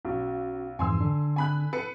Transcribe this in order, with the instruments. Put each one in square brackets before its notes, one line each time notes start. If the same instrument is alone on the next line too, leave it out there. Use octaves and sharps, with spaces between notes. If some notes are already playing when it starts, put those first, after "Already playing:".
[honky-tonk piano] B1 [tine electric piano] C#4 F#4
[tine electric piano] F2 G#2 E3 [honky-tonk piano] G#5 C6 E6
[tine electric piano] D3 D4
[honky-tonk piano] G#5 B5 F#6
A4 B4 C#7